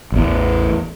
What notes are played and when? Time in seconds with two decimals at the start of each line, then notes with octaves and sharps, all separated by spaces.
0.12 A1 E2